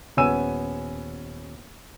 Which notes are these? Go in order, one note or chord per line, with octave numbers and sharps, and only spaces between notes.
D#1 B3 C#4 G#5 E6 D#7